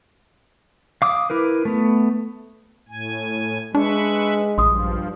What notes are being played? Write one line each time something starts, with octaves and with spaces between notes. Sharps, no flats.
F5 D6 D#6
E4 A#4 B4
A3 B3
A2 G#5
G#3 D4 B4 E5 C#6
A#1 G2 F3 C6 D#6